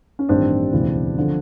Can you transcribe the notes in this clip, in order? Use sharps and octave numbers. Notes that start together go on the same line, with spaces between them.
C#4
A1 G2 D#3 C4 D4
E1 D2 C#3 E3
D3 F3